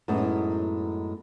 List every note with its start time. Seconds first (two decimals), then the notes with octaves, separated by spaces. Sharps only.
0.08 F#2 A2 G#3 B3 D#4